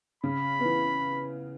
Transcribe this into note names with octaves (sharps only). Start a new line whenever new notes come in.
C#3 B5
B3
E3